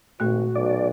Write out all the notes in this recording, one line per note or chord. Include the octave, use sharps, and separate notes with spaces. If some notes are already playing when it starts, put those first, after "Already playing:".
G#1 A#2 A3 F#4 F#6
B1 D5